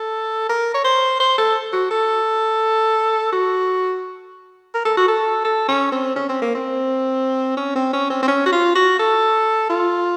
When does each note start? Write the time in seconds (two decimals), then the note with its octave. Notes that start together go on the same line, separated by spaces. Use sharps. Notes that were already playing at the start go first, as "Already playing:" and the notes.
Already playing: A4
0.49 A#4
0.74 C#5
0.84 C5
1.20 C5
1.38 A4
1.73 F#4
1.90 A4
3.32 F#4
4.74 A#4
4.85 A4
4.97 F#4
5.08 A4
5.44 A4
5.68 C#4
5.92 C4
6.16 C#4
6.29 C4
6.42 A#3
6.55 C4
7.57 C#4
7.75 C4
7.93 C#4
8.10 C4
8.22 C4
8.28 C#4
8.45 F#4
8.52 F4
8.75 F#4
8.99 A4
9.69 F4